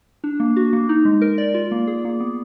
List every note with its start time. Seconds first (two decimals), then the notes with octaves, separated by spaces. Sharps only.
0.24 D4
0.40 A#3
0.56 F#4
0.73 A#3
0.89 D#4
1.05 G#3
1.22 A#4
1.38 D5
1.54 F4
1.71 A#3
1.87 G#4
2.05 A#3
2.20 B3